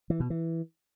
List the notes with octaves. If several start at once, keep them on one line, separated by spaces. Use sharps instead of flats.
E3
B2
E3